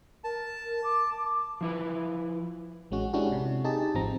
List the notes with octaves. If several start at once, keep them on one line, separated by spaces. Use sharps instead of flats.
A#4 A5
D6
F3 E4 B4
A1 G#3 C#4 F#4
G#3 C#4 D4 E4 F#4 G4
C3
D#4 G4 G#4 A5
G#1 F3 C4 A#5